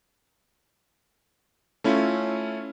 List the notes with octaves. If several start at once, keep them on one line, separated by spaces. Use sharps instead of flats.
A3 C#4 E4 F4